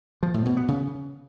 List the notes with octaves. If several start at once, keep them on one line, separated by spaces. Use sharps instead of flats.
F3
A2
B2
B3
C#3